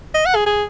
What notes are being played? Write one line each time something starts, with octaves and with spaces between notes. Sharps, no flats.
D#5
F#5
G#4
G#4